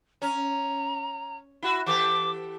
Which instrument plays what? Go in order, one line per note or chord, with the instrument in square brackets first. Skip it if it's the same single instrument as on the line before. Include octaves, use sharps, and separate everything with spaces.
[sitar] C#4 [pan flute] A#5
[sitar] E4 F#4
[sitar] E3 G4 A4 [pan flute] D6